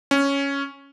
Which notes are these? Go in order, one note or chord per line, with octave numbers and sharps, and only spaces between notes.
C#4